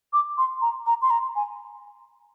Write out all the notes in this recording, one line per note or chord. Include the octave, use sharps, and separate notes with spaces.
D6
C6
A#5
A#5
C6
A#5
G#5